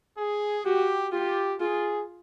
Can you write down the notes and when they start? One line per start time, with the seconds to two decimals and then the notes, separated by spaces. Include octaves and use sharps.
0.18 G#4
0.65 F#4 G4
1.12 F4 G4
1.60 F4 G#4